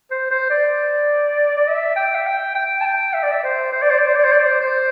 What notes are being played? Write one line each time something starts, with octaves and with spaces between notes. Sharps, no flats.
C5
C5
D5
D5
E5
G5
E5
G5
G5
A5
G5
E5
D5
E5
C5
C5
D5
C5
D5
C5
D5
C5
D5
C5
C5